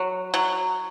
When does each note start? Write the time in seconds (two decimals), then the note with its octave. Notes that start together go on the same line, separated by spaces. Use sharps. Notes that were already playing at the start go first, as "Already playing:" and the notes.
Already playing: F#3
0.34 F#3